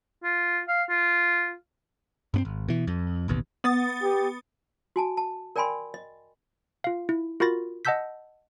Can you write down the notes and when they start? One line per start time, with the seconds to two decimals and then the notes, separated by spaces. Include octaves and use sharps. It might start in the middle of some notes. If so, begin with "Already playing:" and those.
0.24 F4
0.68 F5
0.90 F4
2.34 G2 B3 C4
2.45 G#1
2.68 B2 E3
2.87 F2
3.28 A1 D#2 B2
3.64 B3 D#6 A6
4.02 G4
4.96 F#4 G#5 A5
5.17 A5
5.56 A#4 D5 G5 G#5 B5 C6
5.94 D#5
6.84 F4 F5
7.09 E4
7.40 F4 F#4 A#4 B5 A6 A#6
7.85 D#5 F#5 A5 E6 G6 B6